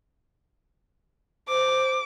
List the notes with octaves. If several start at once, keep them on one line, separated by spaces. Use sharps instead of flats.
C5 D6